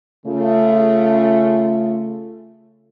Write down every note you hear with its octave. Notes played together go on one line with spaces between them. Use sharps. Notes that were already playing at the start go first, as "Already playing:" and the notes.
C#3 A3 F4